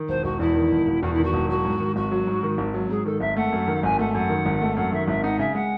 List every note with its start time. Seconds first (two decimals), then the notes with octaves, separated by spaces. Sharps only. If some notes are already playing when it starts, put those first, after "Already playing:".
Already playing: D#3
0.08 E1 C5
0.24 E1 F#4
0.40 E2 E4
0.56 D#3
0.71 E1
0.87 E1
1.02 E2 F#4
1.13 D#3 E4
1.24 F#4
1.33 E1
1.49 F#3 F#4
1.64 G#2
1.80 D#3
1.96 G#1 F#4
2.11 F#3
2.27 G#2
2.43 D#3
2.58 G#1
2.74 F#3
2.89 G#2 G#4
3.06 D#3 A4
3.21 G#1 E5
3.36 A3 F#5
3.52 F#2
3.68 D#3
3.83 G#1 G#5
3.99 A3 F#5
4.14 F#2 F#5
4.30 D#3
4.46 G#1
4.61 A3
4.77 F#2 F#5
4.92 D#3 E5
5.08 G#1 E5
5.24 D#4 F#5
5.39 C#3 E5
5.54 G#3 F#5